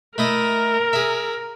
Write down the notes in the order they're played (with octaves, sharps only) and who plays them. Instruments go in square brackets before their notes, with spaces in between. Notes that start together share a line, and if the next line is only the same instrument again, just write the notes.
[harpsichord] A3 E4 D#5 [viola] A#4
[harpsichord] G#4 E5